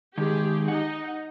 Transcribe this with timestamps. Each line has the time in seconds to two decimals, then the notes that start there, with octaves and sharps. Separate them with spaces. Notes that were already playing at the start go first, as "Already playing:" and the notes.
0.18 D#3 G#3 G4 G#4
0.68 D#4 F#5